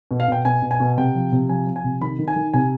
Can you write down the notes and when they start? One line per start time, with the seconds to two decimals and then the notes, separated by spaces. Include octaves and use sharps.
0.11 B2
0.20 F5
0.28 B2 G5
0.45 B2 G#5
0.62 B2
0.71 G#5
0.80 B2
0.98 C3 G5
1.15 F3
1.32 C3
1.49 F3 G#5
1.67 F3
1.76 G#5
1.84 C3
2.01 D#3 B5
2.19 D#3
2.28 G#5
2.36 D#3
2.54 C3 G#5